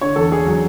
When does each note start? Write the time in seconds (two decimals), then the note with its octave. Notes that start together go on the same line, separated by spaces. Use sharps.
0.01 D3 C#5
0.16 E2 A4
0.32 E2 G#4
0.46 F#3